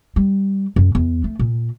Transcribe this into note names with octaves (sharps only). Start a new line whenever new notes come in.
G3
F#2
E2
A3
A#2